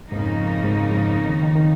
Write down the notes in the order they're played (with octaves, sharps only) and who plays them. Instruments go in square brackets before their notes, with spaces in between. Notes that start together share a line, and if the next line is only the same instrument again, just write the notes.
[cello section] F2 C#3 A#3 D#4 [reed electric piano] G#2
[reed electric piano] G#2
G#2
D#3
D#3
D#3